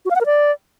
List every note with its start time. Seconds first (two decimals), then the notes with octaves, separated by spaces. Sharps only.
0.05 F#4
0.10 F5
0.16 F#5
0.21 A#4
0.26 D5